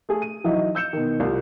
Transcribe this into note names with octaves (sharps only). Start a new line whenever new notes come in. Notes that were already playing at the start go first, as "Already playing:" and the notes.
A3 G#4 A4
D#7
E3 F#3 D#4 E4
E6 G6 C#7 E7
B2 D#3
C2 F4